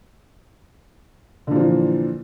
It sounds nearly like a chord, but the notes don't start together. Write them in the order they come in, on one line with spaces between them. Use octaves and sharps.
D3 A#2 F3 E3